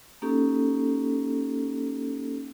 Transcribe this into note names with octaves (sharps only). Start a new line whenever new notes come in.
A#3 C#4 D#4 G4 A4